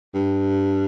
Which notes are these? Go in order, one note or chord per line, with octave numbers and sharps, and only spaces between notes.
G2